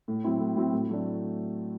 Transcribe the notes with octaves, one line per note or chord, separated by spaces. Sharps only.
A2
F#3 C4 E4
A2
F#3 C4 E4
A2
F#3 A3 D4